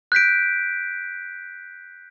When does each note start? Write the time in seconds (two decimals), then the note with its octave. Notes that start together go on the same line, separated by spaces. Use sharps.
0.12 F#6 G6 B6 D7